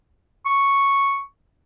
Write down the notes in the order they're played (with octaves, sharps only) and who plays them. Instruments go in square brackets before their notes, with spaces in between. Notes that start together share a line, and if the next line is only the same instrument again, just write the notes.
[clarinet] C#6